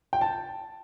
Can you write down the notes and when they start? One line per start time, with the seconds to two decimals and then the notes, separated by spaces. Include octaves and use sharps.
0.13 G5
0.21 A5